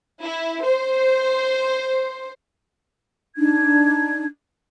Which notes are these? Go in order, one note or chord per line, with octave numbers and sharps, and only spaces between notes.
E4
C5
D4 D#4 G#6